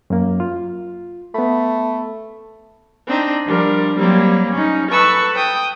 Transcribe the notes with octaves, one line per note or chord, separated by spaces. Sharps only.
F#2 A#3
F4
A3 B3 B5
C4 D4 D#4
F3 G3 D4 A#4
F#3 G3 A#3 C4
C#4 D#4
A4 B4 C#6 E6
G5 D#6